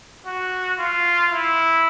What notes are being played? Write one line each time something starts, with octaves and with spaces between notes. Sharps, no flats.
F#4
F4
E4